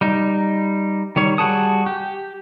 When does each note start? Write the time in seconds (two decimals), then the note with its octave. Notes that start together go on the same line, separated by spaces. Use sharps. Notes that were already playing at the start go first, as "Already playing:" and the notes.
0.01 G3 D#4
1.16 D#3 G3 C#5
1.38 G3 F#4 G#4 A5 D#6
1.86 G4